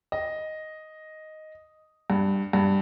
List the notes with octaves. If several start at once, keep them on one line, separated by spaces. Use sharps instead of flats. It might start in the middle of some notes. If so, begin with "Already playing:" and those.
D#5
G2
G2